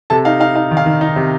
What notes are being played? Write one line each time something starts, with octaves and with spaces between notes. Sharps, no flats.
C3 A4 A5
D#4 F5
D#4 F5
D#4 F5
D#3
F5
D#3
D#4
C3